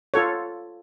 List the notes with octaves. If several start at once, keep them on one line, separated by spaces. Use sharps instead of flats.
F4 A4 C#5